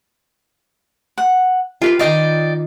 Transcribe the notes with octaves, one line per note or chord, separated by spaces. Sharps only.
F#5
F4 G4 B4 F5
D#3 D5 D#5 F5 G5